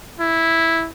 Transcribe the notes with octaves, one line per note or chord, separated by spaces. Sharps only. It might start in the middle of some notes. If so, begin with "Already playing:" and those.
E4